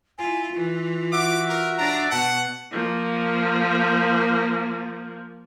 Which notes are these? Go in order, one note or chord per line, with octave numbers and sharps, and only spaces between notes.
E4 F4 G#5
E3 F4
F#4 E5 D6
A#4
D4 D5 A#5
B2 F#5 A5
F3 A#3